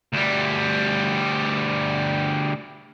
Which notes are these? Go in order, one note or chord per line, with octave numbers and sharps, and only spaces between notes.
D2 G3